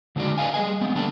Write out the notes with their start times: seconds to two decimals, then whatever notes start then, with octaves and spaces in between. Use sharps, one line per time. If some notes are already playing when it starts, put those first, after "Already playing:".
0.16 D3 G#3 D#4 F#4 D5
0.38 B4 D5 D#5 F5 G#5
0.54 G3 G#4 D#5 G#5
0.81 G#3 B3 C4
0.95 D3 G3 A3 A#3 D4